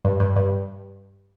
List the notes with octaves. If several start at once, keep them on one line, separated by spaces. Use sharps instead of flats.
G2
G2
G2